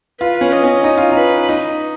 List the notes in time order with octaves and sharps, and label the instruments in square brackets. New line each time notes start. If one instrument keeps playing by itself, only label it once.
[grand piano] F4 [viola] B4
[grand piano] C#4
[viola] D#5
[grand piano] C#4
D#4
F4
[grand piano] D#4 [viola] B4
[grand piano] D#4